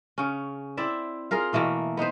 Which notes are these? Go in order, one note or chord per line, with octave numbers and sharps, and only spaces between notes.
C#3 C#4
C4 E4 D5 E5
F4 G#4 A#4 F5
B2 E3 A3 A#3
B3 D#4 B4 C5